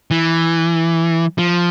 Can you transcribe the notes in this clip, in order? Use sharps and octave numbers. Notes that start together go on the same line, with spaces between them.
E3
F3